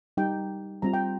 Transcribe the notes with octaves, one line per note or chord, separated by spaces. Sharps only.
G3 D#4 G4 G5
G3 C4 F4 A#5
G5